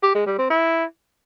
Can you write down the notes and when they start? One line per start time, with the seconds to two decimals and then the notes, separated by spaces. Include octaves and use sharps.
0.03 G4
0.15 G#3
0.26 G3
0.38 C4
0.50 E4